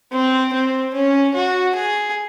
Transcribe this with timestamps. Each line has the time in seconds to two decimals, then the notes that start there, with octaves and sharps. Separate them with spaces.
0.12 C4
0.53 C4
0.94 C#4
1.34 F#4
1.75 G#4